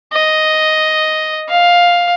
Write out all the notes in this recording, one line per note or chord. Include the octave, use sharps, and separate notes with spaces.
D#5
F5